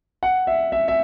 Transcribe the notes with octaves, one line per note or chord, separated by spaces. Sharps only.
F#5
E5
E5
E5